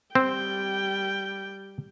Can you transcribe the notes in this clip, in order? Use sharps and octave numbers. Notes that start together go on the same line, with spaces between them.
G3 C4 G5